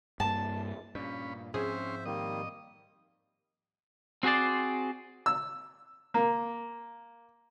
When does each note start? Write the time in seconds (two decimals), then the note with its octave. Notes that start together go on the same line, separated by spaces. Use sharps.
0.20 G2 A#3 A5
0.95 G2 A#2 C#4 B5
1.54 G#2 F3 C4 C#4 G#4 C5 E5 C6
2.05 D#3 G3 A#3 D#5
4.23 C4 F#4 G#4 C5 D5
5.26 E6
6.14 A#3